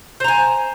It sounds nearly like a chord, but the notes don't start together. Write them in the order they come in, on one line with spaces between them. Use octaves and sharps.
C5 A#5 G#5